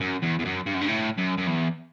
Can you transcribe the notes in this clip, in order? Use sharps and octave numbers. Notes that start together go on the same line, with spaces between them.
F#2
E2
E2
F#2
G2
F#2
G2
A2
F#2
F#2
E2